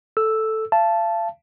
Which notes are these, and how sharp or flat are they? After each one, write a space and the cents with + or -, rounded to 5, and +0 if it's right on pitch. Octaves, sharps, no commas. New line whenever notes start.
A4 +0 E6 +0
F5 -40 A5 -5